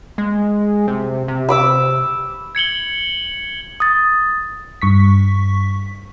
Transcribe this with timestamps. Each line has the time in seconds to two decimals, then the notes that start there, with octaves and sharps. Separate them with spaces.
0.18 G#3
0.88 C3
1.28 C3
1.49 B5 D6 E6
2.55 G#6 C#7 F#7 G7
3.80 D#6 A6
4.82 G2 C#6 B6